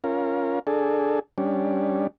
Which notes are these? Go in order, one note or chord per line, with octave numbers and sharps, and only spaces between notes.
C#4 F4 A#4
D4 G#4 A4
G3 C#4 D4